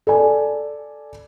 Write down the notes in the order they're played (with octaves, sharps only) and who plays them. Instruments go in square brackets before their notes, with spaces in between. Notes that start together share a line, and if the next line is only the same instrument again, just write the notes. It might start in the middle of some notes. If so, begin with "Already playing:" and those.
[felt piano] A4 D5 G#5